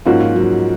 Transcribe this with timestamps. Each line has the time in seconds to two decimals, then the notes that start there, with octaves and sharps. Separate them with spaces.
0.06 G#2 F3 A#3 C#4 F4 F#4
0.20 F4
0.36 F#3